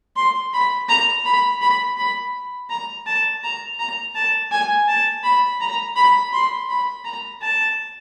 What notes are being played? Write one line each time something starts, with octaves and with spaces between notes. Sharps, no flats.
C6
B5
A#5
B5
B5
B5
A#5
A5
A#5
A#5
A5
G#5
A5
B5
A#5
B5
C6
B5
A#5
A5